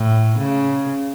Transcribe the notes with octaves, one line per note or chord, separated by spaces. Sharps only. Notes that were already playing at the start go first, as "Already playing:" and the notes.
Already playing: A2
C#3